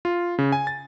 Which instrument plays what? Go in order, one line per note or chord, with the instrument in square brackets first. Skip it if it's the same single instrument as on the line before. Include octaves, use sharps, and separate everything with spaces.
[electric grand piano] F4
C#3
G#5
A6